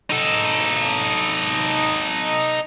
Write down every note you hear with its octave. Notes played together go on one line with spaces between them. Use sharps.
D#4 A4